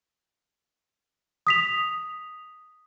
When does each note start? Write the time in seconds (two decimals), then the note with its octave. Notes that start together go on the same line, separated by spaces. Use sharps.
1.47 D#6 B6 F7